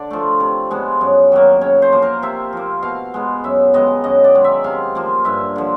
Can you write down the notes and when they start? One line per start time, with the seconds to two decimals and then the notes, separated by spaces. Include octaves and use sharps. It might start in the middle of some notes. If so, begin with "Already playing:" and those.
Already playing: D3 D5
0.10 F3 A3
0.40 C3
0.71 F3 G#3 B3
1.01 F#2
1.32 D#3 F#3 A#3
1.61 C#3 C#5
1.82 C5
1.93 F3 A#3
2.02 A#4
2.22 C3 E5
2.53 F3 A#3
2.82 B2 F5
3.14 G#3 B3
3.44 F#2 E5
3.74 D#3 G#3 B3 D#5
4.04 F#2 D#5
4.24 D5
4.35 D#3 G#3
4.44 E5
4.64 C3 F5
4.95 F3 A#3
5.25 G2 E5
5.56 D3 F3